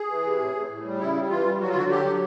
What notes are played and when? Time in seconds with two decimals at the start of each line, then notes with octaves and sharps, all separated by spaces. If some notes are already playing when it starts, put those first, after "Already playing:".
Already playing: G#4
0.09 E3
0.24 C3
0.39 A2
0.54 A2
0.70 A2
0.85 G3
0.99 C#3 E4
1.15 G3
1.29 E3 F4
1.44 G3
1.60 F#3 F#4
1.69 F4
1.74 D3 F#4
1.91 F#3 G4
2.06 D3